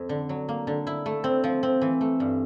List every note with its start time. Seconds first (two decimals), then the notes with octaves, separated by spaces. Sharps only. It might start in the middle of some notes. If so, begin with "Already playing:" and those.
Already playing: F2
0.09 D3
0.29 F#3
0.49 A#3
0.67 D3
0.87 E4
1.06 A3
1.24 C4
1.44 F3
1.63 C4
1.82 E3
2.01 A3
2.20 G2